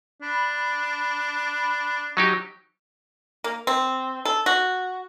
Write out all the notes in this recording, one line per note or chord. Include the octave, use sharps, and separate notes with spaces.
D4 B5
F#3 D#4 G4
A#3
C4
A4
F#4